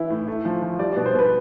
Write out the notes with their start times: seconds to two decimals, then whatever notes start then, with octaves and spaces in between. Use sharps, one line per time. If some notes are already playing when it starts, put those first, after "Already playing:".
Already playing: E3 E4
0.10 A2
0.28 A3
0.45 F3
0.62 F3
0.79 G3 D5
0.92 B2 D5
1.06 C5
1.14 B2 B4